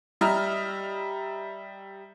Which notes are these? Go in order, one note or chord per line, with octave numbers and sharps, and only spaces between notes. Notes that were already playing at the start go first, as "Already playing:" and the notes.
G3 D#5 E5 A#5 F6